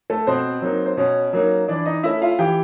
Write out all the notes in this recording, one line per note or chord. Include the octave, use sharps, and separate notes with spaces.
A3 A4
B2 C4 C5
F#3 A#3 D#4
C5
B2 C#4 C#5
F#3 A#3 D#4
E3 D4 D5
D#4 D#5
A3 C#4 E4 E5
F4 F5
E3 G4 G5